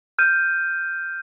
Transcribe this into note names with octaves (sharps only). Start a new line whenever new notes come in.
F6 G6 D#7